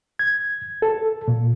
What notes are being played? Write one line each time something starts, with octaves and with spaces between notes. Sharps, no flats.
G#6
A4
A#2